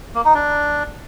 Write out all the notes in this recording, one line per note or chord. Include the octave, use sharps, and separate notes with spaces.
A#3
D#4
D4